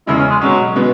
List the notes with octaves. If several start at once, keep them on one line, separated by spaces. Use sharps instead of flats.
E2 C#3 G#3 E4
C#4
G#3
B2 F#3 G#3 C#4
B2 G#3 B3